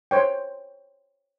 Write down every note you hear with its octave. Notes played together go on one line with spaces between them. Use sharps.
C5 C#5 G5